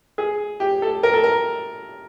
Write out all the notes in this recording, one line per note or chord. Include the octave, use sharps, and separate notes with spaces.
G#4
G4
A4
A#4
A4
A#4